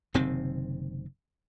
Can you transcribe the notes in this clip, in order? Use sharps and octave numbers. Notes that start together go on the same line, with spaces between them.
F#1 C3 D#3 C4